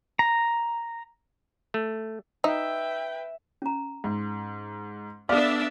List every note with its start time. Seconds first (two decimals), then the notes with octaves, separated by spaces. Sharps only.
0.19 A#5
1.74 A3
2.44 D#4 B4 E5 G5
3.62 C#4 A#5
4.04 G#2
5.29 B3 D4 A4 D5 E5 F5 F6